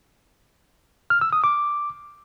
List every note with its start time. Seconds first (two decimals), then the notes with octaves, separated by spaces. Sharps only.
1.10 F6
1.21 E6
1.33 D#6
1.44 D6